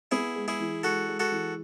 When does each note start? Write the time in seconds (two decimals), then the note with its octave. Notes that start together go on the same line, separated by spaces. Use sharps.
0.11 B3 E4 G#4
0.36 G#3
0.48 E4 G#4
0.60 E3
0.83 G#3 F#4 A4
1.08 G#3
1.20 F#4 A4
1.32 E3